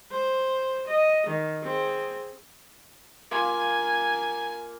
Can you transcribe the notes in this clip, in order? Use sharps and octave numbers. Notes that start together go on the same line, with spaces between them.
C5
D#5
D#3
C4 G#4
A#3 F4 G#5